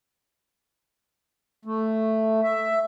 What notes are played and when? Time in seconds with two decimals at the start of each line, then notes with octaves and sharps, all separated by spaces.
1.65 A3
2.43 E5